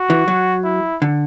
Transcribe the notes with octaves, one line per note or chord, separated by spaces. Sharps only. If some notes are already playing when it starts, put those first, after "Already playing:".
Already playing: F#4
E3
F#3
E4
D3